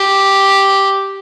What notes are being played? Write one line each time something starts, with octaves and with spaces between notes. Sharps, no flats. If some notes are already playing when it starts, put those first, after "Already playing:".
Already playing: G4